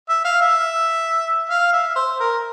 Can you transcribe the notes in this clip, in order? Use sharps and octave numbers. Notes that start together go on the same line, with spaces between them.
E5
F5
E5
F5
E5
C5
A#4